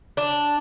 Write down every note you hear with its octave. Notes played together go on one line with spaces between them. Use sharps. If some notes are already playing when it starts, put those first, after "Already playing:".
D4